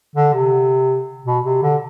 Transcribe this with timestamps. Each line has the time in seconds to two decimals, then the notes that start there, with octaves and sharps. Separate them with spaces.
0.16 D3
0.34 C3
1.26 B2
1.45 C3
1.63 D3